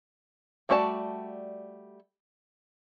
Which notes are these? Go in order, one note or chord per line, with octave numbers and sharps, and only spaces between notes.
G3 A3 F#4 D5 A5